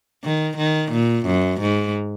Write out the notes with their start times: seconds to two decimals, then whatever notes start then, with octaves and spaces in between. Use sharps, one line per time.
0.24 D#3
0.58 D#3
0.92 A#2
1.26 F#2
1.61 G#2